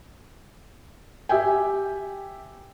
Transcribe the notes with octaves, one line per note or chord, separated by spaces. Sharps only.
G4 E5 G5 G#5